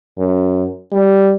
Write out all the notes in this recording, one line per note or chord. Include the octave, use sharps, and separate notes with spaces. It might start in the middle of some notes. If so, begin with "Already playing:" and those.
F#2
G3